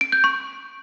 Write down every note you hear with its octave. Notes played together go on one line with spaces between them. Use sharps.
D7
G6
C#6